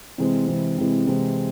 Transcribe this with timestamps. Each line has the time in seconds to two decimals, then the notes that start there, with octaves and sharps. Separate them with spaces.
0.18 C3 E3 G#3 C4
0.47 C3 E3 G#3 C4
0.78 C3 E3 G#3 C4
1.07 C3 E3 G#3 C4